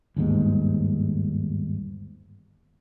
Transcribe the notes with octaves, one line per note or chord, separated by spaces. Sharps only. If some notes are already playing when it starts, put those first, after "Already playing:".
G1 D#2 G#2